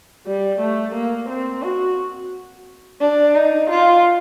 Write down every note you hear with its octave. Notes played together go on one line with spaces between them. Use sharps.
G3
A3
A#3
C4
F#4
D4
D#4
F4